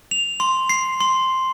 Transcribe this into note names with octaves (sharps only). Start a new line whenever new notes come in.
F7
C6
C7
C6